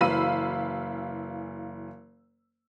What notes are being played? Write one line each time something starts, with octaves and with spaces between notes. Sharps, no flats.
F#1 E3 F5 B5 E6 D#7